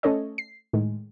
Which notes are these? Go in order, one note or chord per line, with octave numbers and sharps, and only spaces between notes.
A3 C#4 A4 C#5 D#5
C7
A2 D#3 G#3